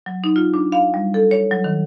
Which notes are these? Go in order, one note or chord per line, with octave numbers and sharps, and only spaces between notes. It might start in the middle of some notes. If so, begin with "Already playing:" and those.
F#3
D#4
F4
D4
F5
G3
A4
C#5
F#3
D#3